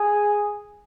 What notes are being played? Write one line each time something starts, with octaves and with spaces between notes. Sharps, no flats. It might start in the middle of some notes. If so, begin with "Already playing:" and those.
Already playing: G#4